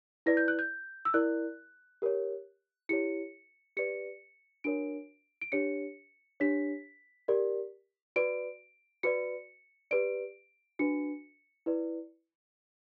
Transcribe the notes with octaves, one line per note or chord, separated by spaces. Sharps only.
E4 B4 D5 A#6
G6
F#6
G6
E6
E4 A#4 D5 F#6
G4 A#4 C#5
E4 G4 C#5 C#7
G4 B4 D5 C#7
D4 F#4 A#4 C#5 D7
D7
D4 G4 C#5 C#7
D4 G4 C#5 B6
G4 A#4 D5
F#4 B4 D5 D7
F#4 B4 D5 C#7
G4 B4 D5 D7
D4 F#4 B4 C#7
E4 B4 D5